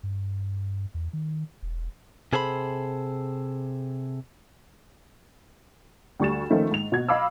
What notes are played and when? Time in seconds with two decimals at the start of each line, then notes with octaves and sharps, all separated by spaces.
0.03 G2
0.94 E2
1.13 D#3
1.62 E1
2.33 C3 G#4 A4 C5 C#5 B5
6.20 D2 G3 C#6 A6 E7
6.50 D#3 F3 A3 C#4 D#4 F4
6.72 G#2 F7
6.92 B2 F#4 G#6
7.09 D#5 F5 B5 D6 E6